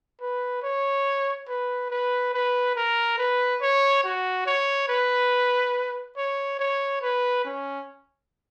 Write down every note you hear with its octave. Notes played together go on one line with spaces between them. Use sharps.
B4
C#5
B4
B4
B4
A#4
B4
C#5
F#4
C#5
B4
C#5
C#5
B4
C#4